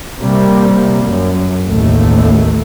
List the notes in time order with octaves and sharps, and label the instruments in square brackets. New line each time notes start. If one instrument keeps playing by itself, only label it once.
[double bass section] C3 G3 A#3
F#2
A1 D#2 A3